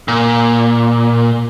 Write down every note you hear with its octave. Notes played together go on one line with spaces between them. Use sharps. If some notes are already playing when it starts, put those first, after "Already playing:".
A#2